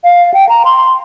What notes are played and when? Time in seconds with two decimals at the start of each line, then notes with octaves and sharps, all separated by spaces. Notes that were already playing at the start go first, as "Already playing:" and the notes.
0.04 F5
0.34 G5
0.49 A#5
0.65 C6